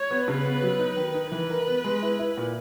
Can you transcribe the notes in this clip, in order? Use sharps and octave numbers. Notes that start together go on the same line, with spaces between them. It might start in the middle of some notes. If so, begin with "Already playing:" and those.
Already playing: C#5
B3
C#3 B4
B3
F#3
D#4
D#3
D#4
E3 B4
A#4
B3
G#3
E4
E4
A#2